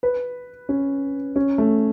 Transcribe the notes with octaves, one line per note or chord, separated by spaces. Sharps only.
B4
C#4
C#4
A3